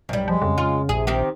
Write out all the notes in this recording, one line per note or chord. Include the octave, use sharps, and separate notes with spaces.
B1 F#2 G3
F3 G#3
F2 C#3
F4
A#1 C3 G#4
D#3 C4 G4